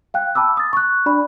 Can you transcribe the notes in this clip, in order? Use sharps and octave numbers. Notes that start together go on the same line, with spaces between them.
F5 G5 F#6
A5 B5 D6 E6
D#6 A6
C#6 F#6
D4 D5 B5